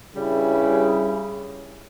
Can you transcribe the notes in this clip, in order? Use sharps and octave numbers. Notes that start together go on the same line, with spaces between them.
G2 C#3 G3 E4